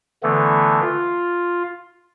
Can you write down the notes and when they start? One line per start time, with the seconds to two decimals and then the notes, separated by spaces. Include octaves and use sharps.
0.23 D3 E3 A3 B3
0.81 F4